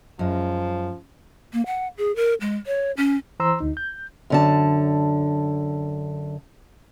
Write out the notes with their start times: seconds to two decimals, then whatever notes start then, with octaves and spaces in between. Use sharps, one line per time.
0.19 F#2 F3 G#3
1.53 A#3
1.66 F#5
1.98 G#4
2.16 A#4
2.41 G#3
2.66 C#5
2.97 C#4
3.40 E3 C5 A#5 C6 E6
3.60 D2 D#4
3.77 G6
4.30 F#2 D3 A5